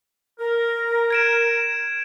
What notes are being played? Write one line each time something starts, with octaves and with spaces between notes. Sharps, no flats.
A#4
G#6 D7 E7